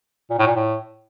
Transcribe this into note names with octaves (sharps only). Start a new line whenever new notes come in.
A#2
A2
A#2
A2